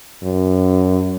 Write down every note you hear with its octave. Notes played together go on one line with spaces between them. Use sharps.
F#2